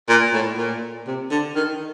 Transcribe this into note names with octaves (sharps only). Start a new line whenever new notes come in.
A#2
A2
A#2
C3
D3
D#3